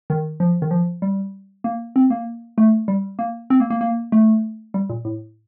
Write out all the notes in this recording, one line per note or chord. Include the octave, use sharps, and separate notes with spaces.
D#3
F3
D#3
F3
G3
A#3
C4
A#3
A3
G3
A#3
C4
A#3
A#3
A#3
A3
G3
A#2
A2